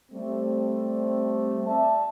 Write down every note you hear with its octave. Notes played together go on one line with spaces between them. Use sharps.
G3 A3 C4
D5 E5 A5